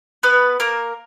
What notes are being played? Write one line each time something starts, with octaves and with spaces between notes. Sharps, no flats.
B3 B4
A#3 A#4